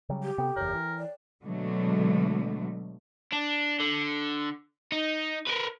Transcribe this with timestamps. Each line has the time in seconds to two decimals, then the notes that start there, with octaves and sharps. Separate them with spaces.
0.09 C#3 F#3 G3
0.23 G4
0.38 C3 B3 A4 G5
0.56 F#1 E2 A#4 C#5
0.74 E3
0.99 D5
1.44 B2 D3 F#3 G#3 A3
3.32 D4
3.80 D3
4.92 D#4
5.47 A#4 B4